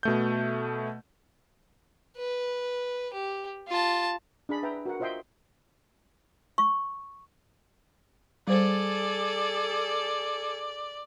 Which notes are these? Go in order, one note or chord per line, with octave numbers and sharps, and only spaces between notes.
B2 A3 G6
B4
G4
F4 A5
D4 G#4 B5
B4 E5 G5 A#5
F#4 A#4 F#5
F4 C5 D#5 E5 G5 C6
C#6
G3 G#4 A4 C5 D5